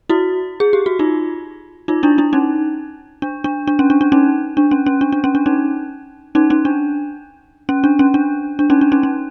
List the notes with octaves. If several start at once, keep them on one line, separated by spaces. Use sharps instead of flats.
E4 F#4
G#4
G4
F#4
D#4 F4
D#4 F4
D4 E4
D4 E4
C#4 D#4
D4
D4
D4
C#4
D4
D4
C#4 D#4
D4
C#4
C#4
D4
D4
C#4
D4
C#4 D#4
C#4 D#4
C#4 D#4
D4
C#4
D4
C#4
D4
D4
C#4 D#4
D4
C#4 D#4
C#4